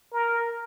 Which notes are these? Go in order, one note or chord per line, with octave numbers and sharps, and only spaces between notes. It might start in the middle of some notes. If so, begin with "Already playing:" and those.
A#4